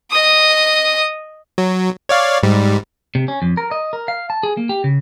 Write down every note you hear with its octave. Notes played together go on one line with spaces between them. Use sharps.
D#5 D#6
F#3
C#5 D5 F5
G#2 G3
C3
C#4
F2
A#4
D#5
A#4
F5
A5
G#4
A#3
G4
C#3